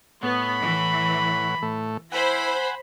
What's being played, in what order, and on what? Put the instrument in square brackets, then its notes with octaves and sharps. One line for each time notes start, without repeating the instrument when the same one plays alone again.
[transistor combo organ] A2 C#5 F#5 [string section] B3 [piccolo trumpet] B5
[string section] E3
[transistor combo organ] A2 A3
[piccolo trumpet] E4 [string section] C5 B5 [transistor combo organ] F#5 G#5